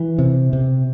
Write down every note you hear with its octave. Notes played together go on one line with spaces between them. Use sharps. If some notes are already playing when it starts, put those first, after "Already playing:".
Already playing: E3
C3
C3